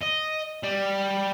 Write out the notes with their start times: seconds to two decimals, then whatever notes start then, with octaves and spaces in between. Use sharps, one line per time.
0.01 D#5
0.63 G3